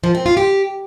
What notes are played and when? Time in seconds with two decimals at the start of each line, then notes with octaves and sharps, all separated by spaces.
0.04 F3
0.15 C4
0.26 F4
0.37 G4